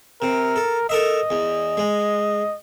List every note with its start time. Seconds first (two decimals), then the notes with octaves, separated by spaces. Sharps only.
0.22 C3 A#4
0.56 A4
0.89 A4 A#4 D#5 E5
1.30 E2
1.77 G#3